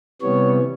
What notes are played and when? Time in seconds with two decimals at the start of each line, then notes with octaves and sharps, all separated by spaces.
0.21 C3 E3 G3 B3 C#5